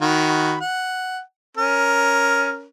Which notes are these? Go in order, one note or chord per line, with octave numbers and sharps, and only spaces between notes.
D#3 F#4 B5
F#5
C#4 A#4